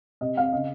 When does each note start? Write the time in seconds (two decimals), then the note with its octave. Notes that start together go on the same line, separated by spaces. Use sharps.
0.21 C3 D#5
0.37 C4 F5
0.53 C#3 D#5